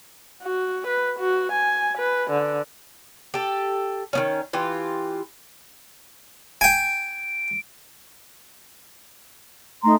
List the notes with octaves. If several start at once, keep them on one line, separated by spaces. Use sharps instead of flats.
F#4
B4
F#4
G#5
B4
D3
G4 A4
D#3 B3 C#4
E3 F4 G4
G5 G#5 D7
A3 D#4 A#5 C6